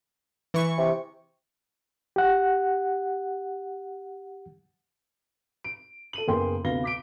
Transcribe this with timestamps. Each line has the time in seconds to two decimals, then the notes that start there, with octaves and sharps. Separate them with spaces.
0.54 E3 C#6
0.78 C3
2.16 G4 F#5
5.64 D7
6.13 A4 D#7 F#7
6.28 F#1 A#3 B3 G#4 G5 C6
6.64 D2 C3 B3 F5 A#6 G7
6.83 D6 B6 D7